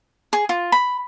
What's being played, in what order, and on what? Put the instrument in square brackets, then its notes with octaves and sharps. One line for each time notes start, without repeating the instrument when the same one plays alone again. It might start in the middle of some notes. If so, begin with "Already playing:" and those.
[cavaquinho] G#4
F4
B5